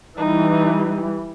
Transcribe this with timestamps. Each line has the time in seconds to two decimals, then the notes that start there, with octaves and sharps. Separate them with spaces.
0.18 E3 G3 D#4